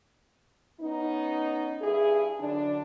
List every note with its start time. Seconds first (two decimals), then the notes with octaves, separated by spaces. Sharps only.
0.81 B3 C#4 D#4
1.82 G2 E4 G#4
2.40 F#2 D3 D4